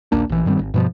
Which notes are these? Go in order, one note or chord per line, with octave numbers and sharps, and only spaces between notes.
D#1 A#1 A#3 D4
A#1 E3
G2 D#3 G3 C4
G#1
G2 B2 F3